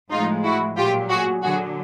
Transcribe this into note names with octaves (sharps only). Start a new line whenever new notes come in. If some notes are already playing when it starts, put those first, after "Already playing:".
A2 F3 G#3 D#4 F4
E4 F#4
A#2 F#3 F4 G4
F#4 G#4
D3 F#3 F#4 G#4